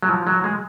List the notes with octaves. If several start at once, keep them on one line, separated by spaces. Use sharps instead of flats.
F#3
F3
F#3
G#3